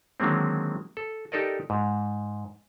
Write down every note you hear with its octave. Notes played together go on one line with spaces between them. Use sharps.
D3 D#3 F#3 G#3 A#3 C4
A4
D#4 G4 A4 A#4 D5 D#5
G#2